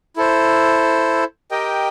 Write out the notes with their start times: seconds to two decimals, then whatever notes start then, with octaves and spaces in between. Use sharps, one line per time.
0.17 E4 A4 C5
1.51 G4 A#4 D#5 G5